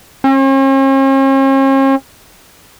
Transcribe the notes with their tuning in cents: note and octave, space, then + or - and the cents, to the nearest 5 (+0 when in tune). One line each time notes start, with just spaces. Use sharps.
C#4 -45